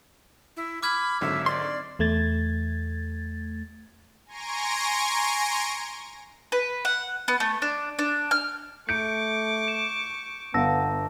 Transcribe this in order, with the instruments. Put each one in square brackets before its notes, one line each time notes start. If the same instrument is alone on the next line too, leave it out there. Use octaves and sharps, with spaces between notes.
[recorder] E4
[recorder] B5 [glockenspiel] D6 F6 G#6
[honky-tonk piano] G#1 D3 F#3 [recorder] E5
[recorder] D5 [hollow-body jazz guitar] C6 [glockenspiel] C7
[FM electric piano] E2 A3 G#6 A6
[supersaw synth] G#5 A#5 C6 C#6 A#6 D7
[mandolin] B4
F#5
B3
A3
D4
D4
F6
[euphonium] A3 [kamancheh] C#6 D6 [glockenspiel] G6 [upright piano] C#7 D7
[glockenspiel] E7
[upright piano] G1 F5 [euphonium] B3 [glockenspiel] A5 E6 A#6